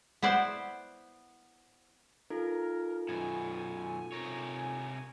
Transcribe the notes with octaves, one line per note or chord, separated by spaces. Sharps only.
B3 E4 C5 D5
D#4 F4 A4 A#4
F#2 B2 G#5
C3 A#4 C#5